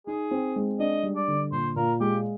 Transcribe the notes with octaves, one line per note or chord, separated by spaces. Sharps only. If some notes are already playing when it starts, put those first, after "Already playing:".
D#4 G#4
C4
G#3
D4 D#5
G3
D5
D3
A#2 C5
A#2 A#4
G#3 G4